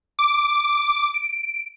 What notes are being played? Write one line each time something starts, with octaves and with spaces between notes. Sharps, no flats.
D6
D7